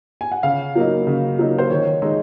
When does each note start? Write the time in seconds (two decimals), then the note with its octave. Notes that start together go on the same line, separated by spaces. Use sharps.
0.21 G#5
0.32 F#5
0.43 C#3 F5
0.75 F#3 A#3 D#4
1.07 C#3
1.39 F#3 A#3 D#4
1.58 C5
1.70 D#3 C#5
2.02 G#3 D#4